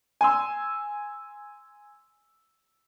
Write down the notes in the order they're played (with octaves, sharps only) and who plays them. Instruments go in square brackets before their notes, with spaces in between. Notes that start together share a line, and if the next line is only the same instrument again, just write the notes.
[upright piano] G#5 C6 E6